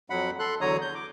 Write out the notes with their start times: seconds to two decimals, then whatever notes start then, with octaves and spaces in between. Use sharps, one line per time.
0.10 F2 F#3 F#5 B5
0.39 A4 C6 F#6
0.61 E2 D3 F#3 C#5 A#5 D#6
0.81 G6
0.95 D6